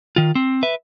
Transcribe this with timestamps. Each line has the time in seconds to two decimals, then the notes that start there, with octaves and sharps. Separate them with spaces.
0.16 D#3 F4
0.35 C4
0.63 B4 E5